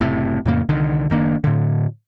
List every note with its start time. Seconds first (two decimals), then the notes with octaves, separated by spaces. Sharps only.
0.01 F#1 A2 C3
0.45 F2 A2 C#3 A#3
0.69 C2 D3 D#3
1.10 F#1 D#3 A#3 D4
1.44 A2 D3